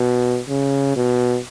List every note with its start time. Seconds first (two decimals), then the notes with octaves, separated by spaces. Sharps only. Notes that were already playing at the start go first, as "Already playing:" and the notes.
Already playing: B2
0.49 C#3
0.96 B2